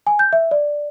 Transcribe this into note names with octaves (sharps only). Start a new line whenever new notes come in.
G#5
G6
E5
D5